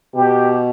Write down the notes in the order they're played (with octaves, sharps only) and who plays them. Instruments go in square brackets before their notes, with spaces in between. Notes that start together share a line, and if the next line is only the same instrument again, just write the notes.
[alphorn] B2 [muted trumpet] G4